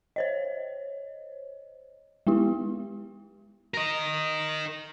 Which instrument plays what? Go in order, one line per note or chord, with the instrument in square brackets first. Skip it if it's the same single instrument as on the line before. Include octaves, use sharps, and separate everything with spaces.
[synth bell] C5 C#5 D#5
G#3 B3 E4 G4
[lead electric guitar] A#4 D#5